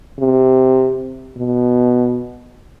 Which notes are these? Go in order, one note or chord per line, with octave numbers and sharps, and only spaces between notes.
C3
B2